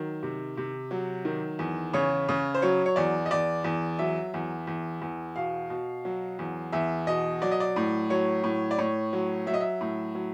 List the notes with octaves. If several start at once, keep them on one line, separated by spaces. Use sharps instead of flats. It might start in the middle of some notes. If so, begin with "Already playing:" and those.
Already playing: D#3 F#3
C3
C3
F#3
D#3
E2
C#3 C#5
C#3
C5
F#3 C#5
C#5
E2 D5
D#5
E2 D5
E2
F#3 E5
E2
E2
E2
B2 F5
B2
F#3
E2
E2 E5
B2 D#5
F#3 D5
D#5
D5
A2
F#3 C#5
A2
D5
A2 C#5
F#3
F#3 E5
D#5
E5
A2
F#3